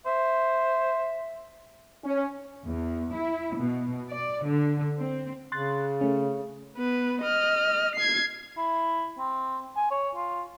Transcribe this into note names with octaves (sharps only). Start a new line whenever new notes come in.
C5 E5
C#4
E2
E4
B2
D5
D3
C4
C#3 C6 F#6 A6
A3 C#4
B3 B4
D#5 F6
G#6 C7
E4
C4
G#5
C#5
F4